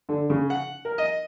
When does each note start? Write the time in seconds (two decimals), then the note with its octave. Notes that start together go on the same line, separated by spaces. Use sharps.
0.09 D3
0.30 C#3
0.50 F#5
0.85 A#4
0.98 D#5